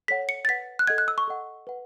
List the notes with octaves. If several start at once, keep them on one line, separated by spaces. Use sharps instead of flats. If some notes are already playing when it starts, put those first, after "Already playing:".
A4 C#5 F#5 B6
C#7
A6
B4 F#5 B6
F#6
A4 D#5 F#5 G#6
F#6
E6
C#6
A4 D#5 F#5
B4 F#5